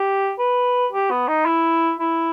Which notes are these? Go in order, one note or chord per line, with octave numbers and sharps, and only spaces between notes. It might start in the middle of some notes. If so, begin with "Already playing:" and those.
Already playing: G4
B4
G4
B3
D#4
E4
E4